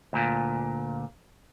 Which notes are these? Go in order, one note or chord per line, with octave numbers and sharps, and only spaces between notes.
D2 A#2